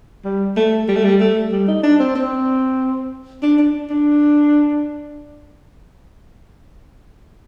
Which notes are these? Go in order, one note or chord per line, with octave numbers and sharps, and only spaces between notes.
G3
A3
G3
A3
G3
A3
G3
D#4
D4
C4
C4
D4
D4
D4